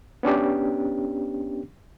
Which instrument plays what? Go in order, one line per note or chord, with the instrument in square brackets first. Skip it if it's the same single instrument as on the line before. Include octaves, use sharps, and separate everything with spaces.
[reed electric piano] B3 C#4 D4 G4